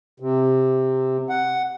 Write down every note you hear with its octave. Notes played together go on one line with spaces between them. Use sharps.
C3
F#5